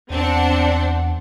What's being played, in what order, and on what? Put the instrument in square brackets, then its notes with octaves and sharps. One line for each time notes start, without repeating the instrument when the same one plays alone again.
[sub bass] E2 [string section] C4 D4 F#5